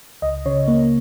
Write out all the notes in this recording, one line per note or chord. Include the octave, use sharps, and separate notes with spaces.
C#2 D#5
C#3 C#5
A#3 C#5